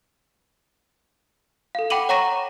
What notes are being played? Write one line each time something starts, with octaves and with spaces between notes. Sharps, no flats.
A4 F5
F#5 G5 B5 D6 D#7 F#7
C#5 F#5 A#5 C#6 A#6 D#7